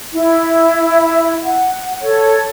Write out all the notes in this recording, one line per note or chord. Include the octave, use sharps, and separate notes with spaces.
E4
F#5
A4 C#5